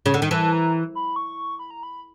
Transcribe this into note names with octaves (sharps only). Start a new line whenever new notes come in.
C#3
D3
D#3
E3 A5
A#5
B5
C#6
B5
A#5
B5